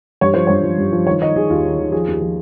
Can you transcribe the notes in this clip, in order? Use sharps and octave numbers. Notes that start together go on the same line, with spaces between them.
G2 C#5
F3 C5
G2 C#5
F3
G2
F3
D#3 C#5
D#3 D#5
D#3 G#4
D#2 F4
D#3
D#3
F3 G#4
D#2
F3